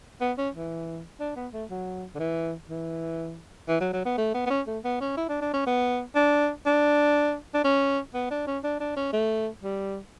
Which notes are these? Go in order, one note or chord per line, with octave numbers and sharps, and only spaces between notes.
B3
C#4
E3
D4
B3
A3
F#3
D3
E3
E3
E3
F#3
F#3
B3
A3
B3
B3
C#4
A3
B3
C#4
E4
D4
D4
C#4
B3
D4
D4
D4
C#4
B3
D4
C#4
D4
D4
C#4
A3
G3